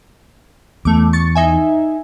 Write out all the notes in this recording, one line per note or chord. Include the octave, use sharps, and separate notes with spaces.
E2 A3 D6
C#6 A6 C#7
D#4 E5 G#5